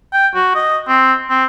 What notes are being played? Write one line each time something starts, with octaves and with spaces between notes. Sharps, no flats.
G5
F#4
D#5
C4
C4